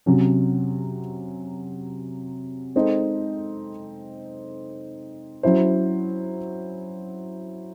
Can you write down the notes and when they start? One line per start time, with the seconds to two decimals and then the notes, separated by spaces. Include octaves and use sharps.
0.06 C3 F#3 C#4
2.75 G#3 C4 D#4 A4
5.43 F#3 C#4 E4 C5